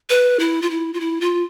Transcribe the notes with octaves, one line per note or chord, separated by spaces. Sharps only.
B4
E4
F4
E4
F4
E4
F4